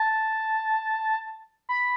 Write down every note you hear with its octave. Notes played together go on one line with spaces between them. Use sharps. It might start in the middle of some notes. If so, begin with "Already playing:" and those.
Already playing: A5
B5